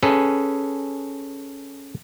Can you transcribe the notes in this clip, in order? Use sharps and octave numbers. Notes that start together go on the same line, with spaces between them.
C#4 G#4 A4 B4